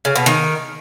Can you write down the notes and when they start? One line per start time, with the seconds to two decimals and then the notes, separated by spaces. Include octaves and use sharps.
0.05 C#3
0.16 B2
0.26 D#3